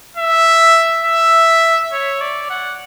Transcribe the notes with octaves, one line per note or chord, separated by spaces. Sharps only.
E5
E5
C#5
D5
F#5